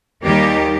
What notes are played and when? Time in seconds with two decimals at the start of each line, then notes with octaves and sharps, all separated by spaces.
0.23 D#2 D#3 G3 A#3 D#4 G4